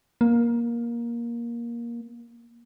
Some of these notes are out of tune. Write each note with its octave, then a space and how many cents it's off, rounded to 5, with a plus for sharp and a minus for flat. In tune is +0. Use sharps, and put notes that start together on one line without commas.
A#3 +15